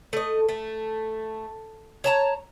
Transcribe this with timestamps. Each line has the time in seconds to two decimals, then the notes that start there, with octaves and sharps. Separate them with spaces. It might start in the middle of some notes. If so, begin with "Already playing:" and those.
0.13 A3 D#5
0.49 A3
2.04 C#5 A5 A#5